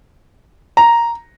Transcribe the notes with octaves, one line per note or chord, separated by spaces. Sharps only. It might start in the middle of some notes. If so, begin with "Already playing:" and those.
A#5